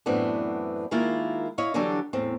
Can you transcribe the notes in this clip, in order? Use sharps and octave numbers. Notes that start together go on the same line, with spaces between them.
F#2 A2 E3 B3 C4 D4
D#3 G#3 A#3 E4 F4 A#4
E4 C#5 D#5 F5
D3 E3 F#3 G3 D4 G4
E2 A2 C4